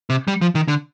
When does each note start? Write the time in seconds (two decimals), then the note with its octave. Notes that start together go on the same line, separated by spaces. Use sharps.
0.10 C3
0.28 G3
0.41 F3
0.55 D#3
0.68 D3